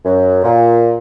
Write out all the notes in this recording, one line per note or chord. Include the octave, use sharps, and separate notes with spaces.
F#2
A#2